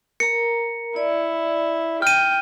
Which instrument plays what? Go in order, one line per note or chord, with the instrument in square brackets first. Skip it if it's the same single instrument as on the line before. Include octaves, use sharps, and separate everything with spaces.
[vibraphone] A#4 A#5 [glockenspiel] C#7
[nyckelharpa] E4 [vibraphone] D5
[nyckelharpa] G5 [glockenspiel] F6 D#7